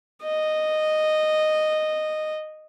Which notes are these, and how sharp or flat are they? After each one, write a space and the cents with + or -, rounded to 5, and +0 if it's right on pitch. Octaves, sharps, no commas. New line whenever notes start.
D#5 -10